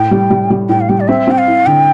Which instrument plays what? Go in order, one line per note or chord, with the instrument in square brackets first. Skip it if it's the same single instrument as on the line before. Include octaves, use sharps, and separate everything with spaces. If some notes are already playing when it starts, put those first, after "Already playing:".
Already playing: [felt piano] A2 [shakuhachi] G5
[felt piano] G3
G3
G3
[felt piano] A2 [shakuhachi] G5
[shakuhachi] F5
[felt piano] G3 [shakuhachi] G5
[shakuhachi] D5
[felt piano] C4 [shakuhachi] E5
[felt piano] C4 [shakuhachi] G5
[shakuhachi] F5
[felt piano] E4
[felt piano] D3 [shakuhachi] G5